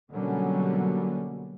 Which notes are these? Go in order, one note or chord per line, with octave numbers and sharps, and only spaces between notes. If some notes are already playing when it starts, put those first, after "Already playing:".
B2 D3 F#3 G3 A#3 C#4